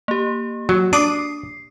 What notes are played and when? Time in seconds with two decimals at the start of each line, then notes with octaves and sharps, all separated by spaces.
0.08 A#3 G4
0.69 F#3
0.93 D4 D6 D#6 C7